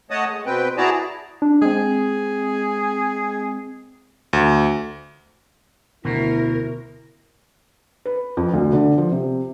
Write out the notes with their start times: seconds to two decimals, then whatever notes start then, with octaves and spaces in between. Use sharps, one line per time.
0.11 A3 C#5 D#5 F#5 A5 D#6
0.28 G#3
0.46 B2 C4 B4 G5
0.77 E4 F#4 G#4 D5 A5 A#5
1.42 D4
1.62 G#3 C4 G#4
4.33 D2
6.05 D2 B2 E4 A#4
8.05 B4
8.37 F2
8.53 D2
8.73 D3
8.98 F3
9.11 C3